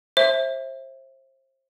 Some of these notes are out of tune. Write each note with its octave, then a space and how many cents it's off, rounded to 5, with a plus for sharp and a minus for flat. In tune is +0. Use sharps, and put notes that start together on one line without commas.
C5 +30 E5 +0